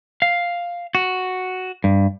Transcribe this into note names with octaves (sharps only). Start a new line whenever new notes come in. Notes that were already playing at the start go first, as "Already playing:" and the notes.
F5
F#4
G2